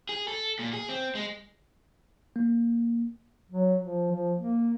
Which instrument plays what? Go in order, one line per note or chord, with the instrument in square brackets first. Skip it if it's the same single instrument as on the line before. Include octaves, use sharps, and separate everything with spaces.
[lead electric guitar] G#4
A4
A#2
G#4
C4
G#3
[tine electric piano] A#3
[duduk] F#3
F3
F3
A#3